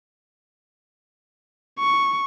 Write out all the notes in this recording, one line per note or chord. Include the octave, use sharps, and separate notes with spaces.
C#6